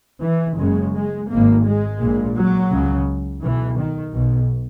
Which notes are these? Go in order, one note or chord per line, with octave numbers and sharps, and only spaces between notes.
E3
F#1 F#2 C#3 G#3
G#3
G#1 G#2 A#3
G#3
A#1 A#2
F#3
C#2 C#3
B1 B2 E3
D#3
B1 B2